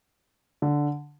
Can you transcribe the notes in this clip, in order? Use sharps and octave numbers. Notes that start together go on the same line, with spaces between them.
D3